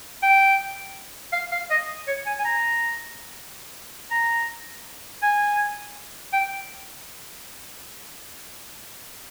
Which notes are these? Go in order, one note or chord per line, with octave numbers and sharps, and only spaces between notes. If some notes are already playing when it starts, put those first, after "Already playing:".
G5
F5
F5
D#5
C#5
G#5
G#5
A#5
A#5
G#5
G5